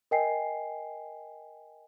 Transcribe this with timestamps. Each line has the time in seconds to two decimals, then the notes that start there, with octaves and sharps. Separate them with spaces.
0.11 A#4 D#5 G5 G#5 C7